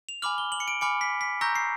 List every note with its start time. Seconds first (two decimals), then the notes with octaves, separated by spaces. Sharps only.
0.09 F7
0.22 G#5 B5 D6 F6 F#7
0.38 G7
0.52 F#7
0.60 C#7
0.68 D7
0.81 G#5 B5 D6 F6 C#7
1.01 B6
1.21 B6
1.41 A#5 C#6 E6 G6 A#6
1.56 C7